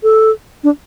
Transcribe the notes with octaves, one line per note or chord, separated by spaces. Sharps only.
A4
D4